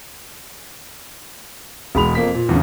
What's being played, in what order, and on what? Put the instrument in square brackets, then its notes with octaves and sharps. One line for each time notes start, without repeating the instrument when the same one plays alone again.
[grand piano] E1 G#3 B5 F7
F2 A#3 B6
A#2
E2 G2 C#3